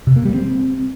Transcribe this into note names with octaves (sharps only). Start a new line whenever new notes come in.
C3
A#3
G3
C4